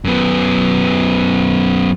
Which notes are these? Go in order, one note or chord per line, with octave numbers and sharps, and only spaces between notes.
F#2 B3